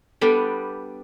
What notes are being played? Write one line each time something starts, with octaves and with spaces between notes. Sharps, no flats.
G3 B3 D4 G4 A4